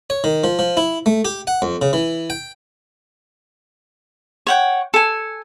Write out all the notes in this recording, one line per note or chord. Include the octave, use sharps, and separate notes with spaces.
C#5
D#3
F3
F3
E4
A3
G4
F#5
F2
C#3
E3
G5
C#5 F#5 G5
A4 G#5